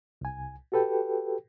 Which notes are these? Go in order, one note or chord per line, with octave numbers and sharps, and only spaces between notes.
C2 G#5
F#4 G4 A4 B4 G5